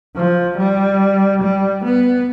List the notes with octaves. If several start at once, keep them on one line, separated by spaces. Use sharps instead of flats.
F3
G3
G3
B3